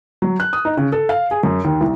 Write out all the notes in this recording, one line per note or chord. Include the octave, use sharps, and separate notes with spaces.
F#3
F#6
D#6
D#4
C#3
A4
F5
G#4
F#2
D#2
C2